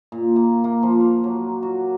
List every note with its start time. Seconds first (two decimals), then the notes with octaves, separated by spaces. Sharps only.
0.12 A#2
0.36 A#3
0.64 A#3
0.83 F3
1.00 F5
1.24 F#3
1.63 F#4